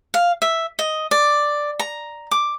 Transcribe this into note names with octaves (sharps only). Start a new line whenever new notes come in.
F5
E5
D#5
D5
A#5
D6